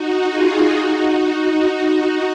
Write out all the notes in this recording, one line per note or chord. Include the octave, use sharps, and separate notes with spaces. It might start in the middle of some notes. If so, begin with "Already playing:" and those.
Already playing: D#4 F#4
F4 G#4
D#4 F#4